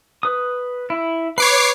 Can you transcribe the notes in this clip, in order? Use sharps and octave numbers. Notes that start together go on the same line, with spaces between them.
B4 D#6
E4
B4 C#5 B5 D6 C7